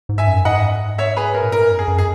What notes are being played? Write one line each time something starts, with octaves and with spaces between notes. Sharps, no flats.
G#2
E5 G#5
F#2
G#2 D#5 F#5
C#5 E5
G#4 B4
A#4
A#2
G#2 A#4
F#2
G#4
F#2
G#4